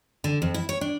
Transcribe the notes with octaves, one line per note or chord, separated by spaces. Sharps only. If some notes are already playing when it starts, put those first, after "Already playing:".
D3
F2
E4
C#5
D4